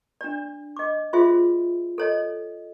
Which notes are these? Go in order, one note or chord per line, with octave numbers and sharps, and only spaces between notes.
D4 D5
D#5 D6
F4 F#4 G#4 C5 E5
A4 C#5 D#5